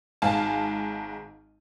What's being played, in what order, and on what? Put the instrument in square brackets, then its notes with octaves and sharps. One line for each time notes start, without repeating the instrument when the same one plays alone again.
[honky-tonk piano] G#1 G#2 F5 G#5 A5